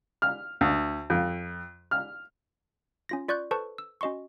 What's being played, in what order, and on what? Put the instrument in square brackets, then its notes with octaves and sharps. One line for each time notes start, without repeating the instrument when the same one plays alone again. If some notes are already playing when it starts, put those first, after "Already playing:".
[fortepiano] F6
D2
F2
F6
[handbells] C#4 F4 A#6
F4 D5 C#6 F#6 G6
A4 B4 C5 A5 C#6
E6
C#4 F#4 D#5 C6 C#6